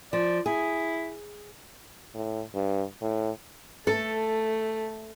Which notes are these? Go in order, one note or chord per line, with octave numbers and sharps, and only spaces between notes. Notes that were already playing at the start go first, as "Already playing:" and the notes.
F3 D5
E4 G#4
A2
G2
A2
A3 A4